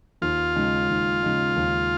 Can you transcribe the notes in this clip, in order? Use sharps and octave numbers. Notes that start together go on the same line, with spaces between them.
D#2 F4
C#3 G#3 D#4
D#2
C#3 G#3 D#4
D#2